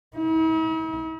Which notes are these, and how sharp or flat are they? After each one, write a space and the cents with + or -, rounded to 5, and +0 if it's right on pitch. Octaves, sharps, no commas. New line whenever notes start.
E4 -45